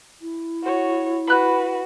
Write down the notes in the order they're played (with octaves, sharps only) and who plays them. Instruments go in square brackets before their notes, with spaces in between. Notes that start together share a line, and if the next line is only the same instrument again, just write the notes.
[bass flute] E4
[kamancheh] F#4 C#5
[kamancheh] F#4 B4 [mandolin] B5 F#6